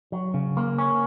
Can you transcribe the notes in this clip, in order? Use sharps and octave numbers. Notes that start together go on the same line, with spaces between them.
F#3
C#3
A#3
C#4